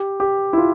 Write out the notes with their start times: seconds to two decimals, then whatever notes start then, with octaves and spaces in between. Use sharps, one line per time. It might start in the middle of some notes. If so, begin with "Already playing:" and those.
Already playing: G4
0.20 G4
0.53 E4
0.58 F4